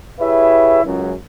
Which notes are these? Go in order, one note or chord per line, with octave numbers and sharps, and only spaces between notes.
E4 G4 G#4 B4 C#5 E5
C#2 F#2